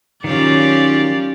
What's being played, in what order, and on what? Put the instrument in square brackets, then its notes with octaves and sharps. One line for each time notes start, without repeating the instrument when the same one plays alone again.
[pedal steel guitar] D#3 F#3 [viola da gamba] C#4 F4 G4 [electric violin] D5